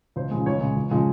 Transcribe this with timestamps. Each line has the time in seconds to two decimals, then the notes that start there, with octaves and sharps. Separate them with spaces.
0.16 C#2 C5
0.31 C#3 F3 G#3
0.46 C#2 C#5
0.61 C#3 G#3
0.76 C#2
0.91 C#3 F3 G#3